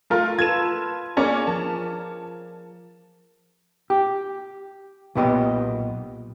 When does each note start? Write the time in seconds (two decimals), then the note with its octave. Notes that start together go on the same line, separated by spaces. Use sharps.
0.10 A3 F4 A#4
0.39 F4 A4 B4 G#6 E7
1.17 A#3 C#4 D4 G#4
1.47 F3 A#4 A5
3.90 G4
5.15 B1 A#2 B3 G4 D#5